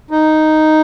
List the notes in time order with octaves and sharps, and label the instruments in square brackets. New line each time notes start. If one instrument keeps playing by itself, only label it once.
[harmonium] D#4